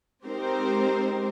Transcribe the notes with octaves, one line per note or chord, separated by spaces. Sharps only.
G#3 C4 D#4 G4 A#4 C5